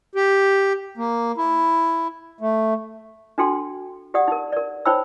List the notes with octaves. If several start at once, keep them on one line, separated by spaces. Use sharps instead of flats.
G4
A#3
E4
A3
D4 F#4 A4 G5 C6
G4 D5 F#5 D#6
D#4 A#4
A#4 D5
D#4 C5 C#5 G5 B5 E6